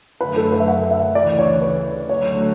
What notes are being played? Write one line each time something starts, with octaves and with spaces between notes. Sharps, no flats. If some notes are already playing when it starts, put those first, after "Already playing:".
F#2 D3 F#3 A3 B4
A4
B4
E5
F#5
E5
D2 C#3 E3 D5
C#5
B4
D2 D3 F#3 A3 C#5